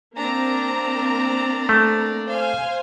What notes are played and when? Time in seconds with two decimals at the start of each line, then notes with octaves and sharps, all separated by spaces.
0.16 A#3 C4 D4 A#5
1.69 A3
2.29 C5 F5 G#5